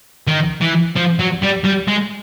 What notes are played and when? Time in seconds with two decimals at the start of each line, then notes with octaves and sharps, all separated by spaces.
0.28 D#3
0.61 E3
0.96 F3
1.19 F#3
1.42 G3
1.64 G3
1.88 G#3